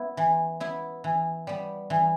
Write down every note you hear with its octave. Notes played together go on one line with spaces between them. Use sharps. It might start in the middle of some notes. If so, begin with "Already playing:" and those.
Already playing: B3 E4
E3
B3 E4
E3
G3 B3
E3